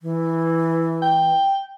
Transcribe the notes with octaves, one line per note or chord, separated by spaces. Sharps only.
E3
G5